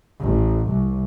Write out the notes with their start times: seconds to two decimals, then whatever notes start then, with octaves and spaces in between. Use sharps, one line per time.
0.20 A1
0.65 C2